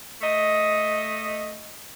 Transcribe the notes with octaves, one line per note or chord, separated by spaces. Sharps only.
A3 D#5